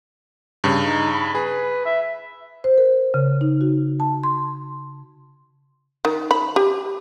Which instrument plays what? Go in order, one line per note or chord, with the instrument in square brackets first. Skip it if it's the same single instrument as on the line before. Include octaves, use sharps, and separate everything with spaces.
[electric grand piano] G2 C#3
[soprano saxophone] D#4
B5
[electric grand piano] G#4 [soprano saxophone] B4
[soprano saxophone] E5
[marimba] C5
A#4
C#3
D#4
F#4
A5
C6
[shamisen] D#3
B5
G4